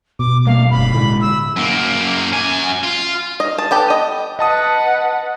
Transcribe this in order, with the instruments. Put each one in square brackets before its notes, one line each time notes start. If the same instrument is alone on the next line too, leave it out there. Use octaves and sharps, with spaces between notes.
[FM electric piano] B2 [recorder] D6
[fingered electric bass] G3 A3 A#3 [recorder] F5
[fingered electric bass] F1 G2 [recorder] B5
[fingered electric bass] A2 D3 G#3
[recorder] E6
[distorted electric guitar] F#2 A#3
F#2 G#5
F4
[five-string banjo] D#5
A5
B3 G4 A4
D#5
[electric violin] B4 F#5 [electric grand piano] D#5 A5 D#6